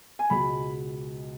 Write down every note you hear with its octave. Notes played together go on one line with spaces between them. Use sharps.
G#5
C#2 B2 G#3 B5